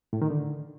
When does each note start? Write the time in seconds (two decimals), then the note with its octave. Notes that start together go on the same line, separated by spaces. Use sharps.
0.13 A2
0.22 D#3
0.30 D3